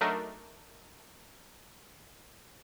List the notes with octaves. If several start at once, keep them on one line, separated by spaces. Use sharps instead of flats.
F#3 A3 D4 D#4 A#4